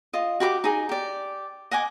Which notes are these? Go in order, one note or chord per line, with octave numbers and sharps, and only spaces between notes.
F4 D#5
F#4 G4 B5 D6
D#4 G#4
G4 D5
D#5 F#5 G#5 D6